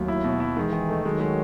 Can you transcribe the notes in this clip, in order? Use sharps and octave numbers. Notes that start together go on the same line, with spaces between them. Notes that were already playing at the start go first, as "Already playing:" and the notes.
Already playing: D#2 F#3 A3
E4
B2
E4
D#3 E3 G#3
D#3
A3
D#3 F#3 G#3
G#3